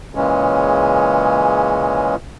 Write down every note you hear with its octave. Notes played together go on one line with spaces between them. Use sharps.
A#2 C#3 E3 G#3 C#4